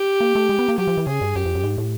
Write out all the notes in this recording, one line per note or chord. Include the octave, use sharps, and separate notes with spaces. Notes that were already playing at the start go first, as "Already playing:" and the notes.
Already playing: G4
A#3
A3
G#3
B3
A#3
F#3 G4
F3
E3
C#3 G#4
G2
F#2 G4
F2
F#2
G#2
A2